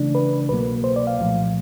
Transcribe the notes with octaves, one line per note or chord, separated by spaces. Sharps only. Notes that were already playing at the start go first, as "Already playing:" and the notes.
Already playing: C#3 E3 A3 D4
B4
C2 B2 F#3 A#3 B4
C5
D5
F5
C2 A#2 F3 A3